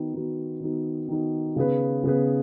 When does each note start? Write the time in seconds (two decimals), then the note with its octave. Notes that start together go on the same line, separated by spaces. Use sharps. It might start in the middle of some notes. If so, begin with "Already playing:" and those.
Already playing: D#3 B3 D#4 F#4
0.14 D#3 B3 D#4 F#4
0.60 D#3 B3 D#4 F#4
1.08 D#3 B3 D#4 F#4
1.56 C#3 B3 G#4 B4
2.04 C#3 B3 G#4 B4